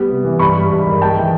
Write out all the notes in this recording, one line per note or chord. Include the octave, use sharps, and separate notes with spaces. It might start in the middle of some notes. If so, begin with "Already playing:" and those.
Already playing: G3 B3
C3
E3
G2 B5 C#6
G#3
G2
D#3
G#3 G5 A5
E3